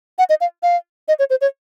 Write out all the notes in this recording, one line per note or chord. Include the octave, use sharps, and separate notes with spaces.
F#5
D#5
F5
F5
D#5
C#5
C5
C#5